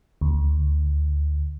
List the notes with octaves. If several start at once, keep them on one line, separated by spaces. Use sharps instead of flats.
D2